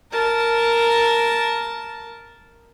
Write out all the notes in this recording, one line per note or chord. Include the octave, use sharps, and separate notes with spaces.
A#4 A5